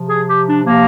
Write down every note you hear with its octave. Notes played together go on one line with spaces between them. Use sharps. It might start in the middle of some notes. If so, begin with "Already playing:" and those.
Already playing: C3 F3
G#4
G4
D4
C3 F3 A#3